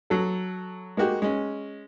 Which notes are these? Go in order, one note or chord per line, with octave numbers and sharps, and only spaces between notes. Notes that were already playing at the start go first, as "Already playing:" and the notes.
F#3 A4
G#3 A#3 F#4 G4
G#3 C#4